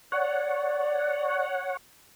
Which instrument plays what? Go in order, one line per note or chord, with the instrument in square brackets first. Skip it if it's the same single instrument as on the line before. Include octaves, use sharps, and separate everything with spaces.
[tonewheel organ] C#5 F#5 [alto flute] D5